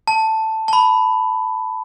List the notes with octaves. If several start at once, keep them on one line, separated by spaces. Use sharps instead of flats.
A5
A5
B5